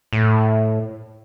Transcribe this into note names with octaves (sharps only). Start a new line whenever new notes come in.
A2